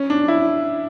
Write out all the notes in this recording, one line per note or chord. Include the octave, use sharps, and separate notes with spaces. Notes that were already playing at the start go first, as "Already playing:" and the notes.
Already playing: C#4
D4
E4